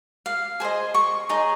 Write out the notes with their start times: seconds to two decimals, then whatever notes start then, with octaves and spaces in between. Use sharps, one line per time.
0.26 F5
0.60 G#4 C5 D#5
0.94 C#6
1.29 D#4 G#4 C#5